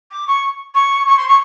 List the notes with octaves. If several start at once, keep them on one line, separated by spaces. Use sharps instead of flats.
D6
C#6
C#6
C#6
C6
C#6